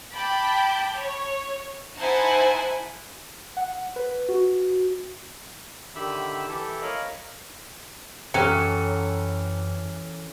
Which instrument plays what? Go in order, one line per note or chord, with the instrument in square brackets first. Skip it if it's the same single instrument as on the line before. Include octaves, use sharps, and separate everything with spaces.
[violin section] G5 A5 B5 D6
C#5
D#4 E4 C5 F#5 G#5 A5
[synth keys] F#5
B4
F#4
[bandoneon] D3 D#3 G4 E5 B5 E6
E3 E4 G4 A4 E5
A#4 C#5 D#5 F5 B5
[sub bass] F#2 [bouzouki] E3 C#4 A4 [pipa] F#3 [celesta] G5 C#7